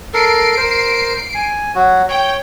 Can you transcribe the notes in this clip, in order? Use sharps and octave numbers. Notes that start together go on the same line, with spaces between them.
A4 A#4 C7 D7
A#4 C5
G#5
F#3 F#4
C#5 G5